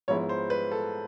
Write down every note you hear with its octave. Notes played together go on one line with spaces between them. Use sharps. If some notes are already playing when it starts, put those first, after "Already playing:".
G#2 F3 G#3 B3 E4 C#5
C5
B4
A4